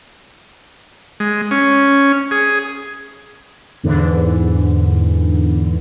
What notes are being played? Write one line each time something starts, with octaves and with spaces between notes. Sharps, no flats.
G#3
C#4
G#4
E2 G#2 D3 E3